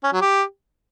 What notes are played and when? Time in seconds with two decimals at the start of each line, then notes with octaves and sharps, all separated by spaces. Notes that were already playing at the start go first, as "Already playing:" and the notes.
0.04 C#4
0.12 F#3
0.21 G4